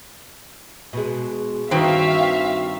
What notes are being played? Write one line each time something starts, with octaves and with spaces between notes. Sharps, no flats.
B2 G#3
G2 D#3 C4 F#4 B4 C5 E5 F5